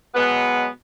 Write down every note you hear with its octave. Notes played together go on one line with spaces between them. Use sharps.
B2 F#3 G#3 B3